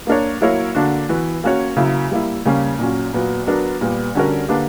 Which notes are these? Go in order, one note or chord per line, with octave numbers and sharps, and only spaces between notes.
A#3 D4 A#4 C#5
F#3 A#3 E4 A#4 C#5
D3 A#3 D4 F#4
E3 B3 F#4 B4
A#3 C#4 F#4 C#5
C#3 F#3 A#3 E4
G3 A#3 E4
C#3 G3 A#3 C#4
A#2 F#3 C#4
A#2 F#3 B3
F#3 B3 D4 A#4
A#2 G3 B3
D3 G3 C#4 F#4 A#4
D3 A#3 D4 G4 B4